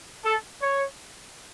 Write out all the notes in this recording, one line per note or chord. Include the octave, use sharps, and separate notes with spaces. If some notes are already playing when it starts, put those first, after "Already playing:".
A4
C#5